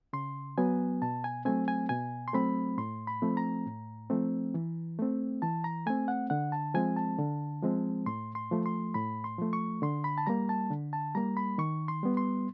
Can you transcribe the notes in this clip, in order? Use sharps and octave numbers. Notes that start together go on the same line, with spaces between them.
C#3 C6
F#3 B3 G#5
B2 A5
G#5
F#3 A3 C4 G#5
G#5
B2 G#5
C6
F#3 A3 C4 B5
A2 C6
B5
F3 A3 C4
A#5
A2
F3 A3 C4
E3
A3 C4
E3 A5
A#5
A3 C4 G#5
F#5
D3 F#5
A5
F3 G#3 C4 G#5
A5
D3
F3 G#3 C4
A2 C6
C6
F3 A3
C6
A2 B5
C6
F3 A3
C#6
D3 C6
B5
A5
G3 A#3 A#5
A5
D3
A5
G3 A#3 A#5
B5
D#3 C#6
C6
G3 B3
C6